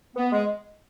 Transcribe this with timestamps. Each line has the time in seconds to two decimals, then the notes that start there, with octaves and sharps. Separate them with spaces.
0.16 B3
0.33 G#3